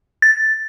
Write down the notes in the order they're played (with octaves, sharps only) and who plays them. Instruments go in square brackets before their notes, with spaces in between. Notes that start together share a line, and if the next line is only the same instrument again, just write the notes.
[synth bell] A6